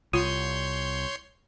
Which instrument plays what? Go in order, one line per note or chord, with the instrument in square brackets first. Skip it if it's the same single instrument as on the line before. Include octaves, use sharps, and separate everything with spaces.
[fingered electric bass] C2 [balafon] F4 [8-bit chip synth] C#5 C6 G6